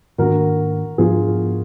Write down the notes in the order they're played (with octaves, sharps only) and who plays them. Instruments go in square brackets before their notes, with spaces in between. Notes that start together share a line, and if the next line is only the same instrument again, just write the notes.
[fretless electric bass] G#2 D#3 A#3 D4 [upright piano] F#4 A#4
[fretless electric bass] G#2 F3 B3 D4 [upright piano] F4 G#4